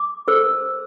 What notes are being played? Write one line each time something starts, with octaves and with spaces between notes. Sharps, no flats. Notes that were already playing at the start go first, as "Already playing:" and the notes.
Already playing: D6
A4 C5 E6